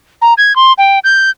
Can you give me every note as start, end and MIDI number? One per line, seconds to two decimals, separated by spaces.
0.22 0.34 82
0.38 0.55 92
0.56 0.73 84
0.78 0.99 79
1.04 1.30 91